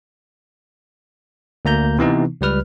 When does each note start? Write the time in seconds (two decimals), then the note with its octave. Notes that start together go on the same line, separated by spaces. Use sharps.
1.65 D2 A#3 A#5 G6
1.98 C3 E3 B3 D#4
2.41 C#2 G3 B4 F6